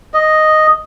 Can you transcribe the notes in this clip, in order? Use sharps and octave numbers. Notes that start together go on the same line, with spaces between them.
D#5